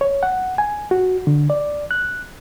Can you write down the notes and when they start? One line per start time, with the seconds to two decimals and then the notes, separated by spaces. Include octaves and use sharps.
0.01 C#5
0.23 F#5
0.58 G#5
0.91 F#4
1.27 D3
1.50 D5
1.91 F#6